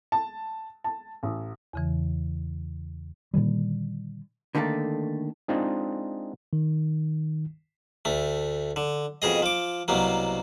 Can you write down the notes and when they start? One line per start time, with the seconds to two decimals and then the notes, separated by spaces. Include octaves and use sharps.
0.12 A5
0.84 A5
1.23 A1
1.73 E2 C#3 E3
3.34 A#2 D3 D#3 G3
4.55 D3 D#3 A3 A#3 A4
5.48 G#3 C4 D4 D#4 F4
6.53 D#3
8.05 D2 A3
8.76 D3
9.22 F2 B2 G#4 D#5
9.42 F3 D6
9.88 C2 B2 F#3 A#3